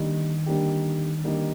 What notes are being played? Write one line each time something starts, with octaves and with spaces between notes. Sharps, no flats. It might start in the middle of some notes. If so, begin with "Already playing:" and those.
Already playing: D3 D#3 G3 A#3 D#4 G4
D3 G3 A#3 D#4 G4
D3 G3 A#3 D#4 G4